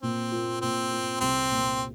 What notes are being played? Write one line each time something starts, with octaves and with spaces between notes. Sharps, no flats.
A#2 C4
A#3 F4
A#2 C4
A#3 F4
C2 C4
A#2 A#3